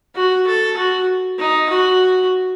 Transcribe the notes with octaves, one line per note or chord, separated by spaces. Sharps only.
F#4
A4
F#4
D#4
F#4